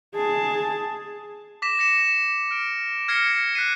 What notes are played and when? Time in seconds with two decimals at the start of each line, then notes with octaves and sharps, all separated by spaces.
0.15 G#4 A5
1.62 D6 A#6 B6 E7
1.78 D6 A#6 C#7 E7
2.51 F6 D7
3.08 F6 G#6 A#6 C7 C#7
3.55 F#6 B6 C7 D#7